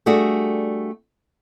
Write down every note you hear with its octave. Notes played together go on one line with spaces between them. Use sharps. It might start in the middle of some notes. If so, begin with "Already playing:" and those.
G3 A3 D4 F#4 G#4